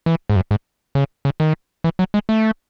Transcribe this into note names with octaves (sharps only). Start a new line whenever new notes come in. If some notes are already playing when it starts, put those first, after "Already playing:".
E3
G#2
F#2
G#2
C#3
C#3
D#3
E3
F#3
G#3
A3